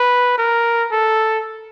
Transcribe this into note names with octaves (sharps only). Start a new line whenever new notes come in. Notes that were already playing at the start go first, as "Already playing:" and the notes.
Already playing: B4
A#4
A4